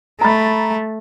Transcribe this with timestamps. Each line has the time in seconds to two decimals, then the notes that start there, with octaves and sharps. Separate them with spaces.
0.21 A3 A#5 B5 A6